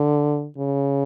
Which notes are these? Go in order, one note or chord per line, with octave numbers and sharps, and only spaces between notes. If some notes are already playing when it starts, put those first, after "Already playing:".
Already playing: D3
C#3